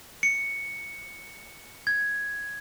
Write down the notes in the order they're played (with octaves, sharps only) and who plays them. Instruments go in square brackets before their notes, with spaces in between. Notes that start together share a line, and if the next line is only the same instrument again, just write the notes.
[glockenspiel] C#7
G#6